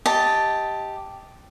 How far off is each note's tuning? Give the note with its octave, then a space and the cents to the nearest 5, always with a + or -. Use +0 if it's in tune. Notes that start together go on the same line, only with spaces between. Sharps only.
G4 +0 D#5 +20 A5 +0